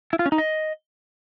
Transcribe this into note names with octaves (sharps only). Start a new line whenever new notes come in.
E4
F4
C#4
D#4
D#5